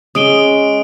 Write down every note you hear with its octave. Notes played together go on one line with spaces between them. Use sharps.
G#3 C#4 D#6 D7 G7